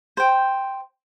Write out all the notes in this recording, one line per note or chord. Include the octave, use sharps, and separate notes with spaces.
C5 G5